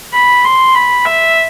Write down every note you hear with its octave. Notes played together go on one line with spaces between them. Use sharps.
B5
C6
B5
E5